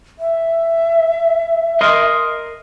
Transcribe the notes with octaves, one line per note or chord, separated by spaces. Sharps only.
E5
A#4 D#5 C6